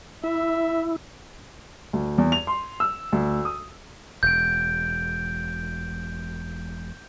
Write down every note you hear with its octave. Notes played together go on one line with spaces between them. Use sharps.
E4 E5
D2
E2
F7
C6
E6
D2
D#6
E1 G6 D7